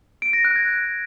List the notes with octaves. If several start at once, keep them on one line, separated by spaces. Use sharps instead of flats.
D7
A#6
F#6
G#6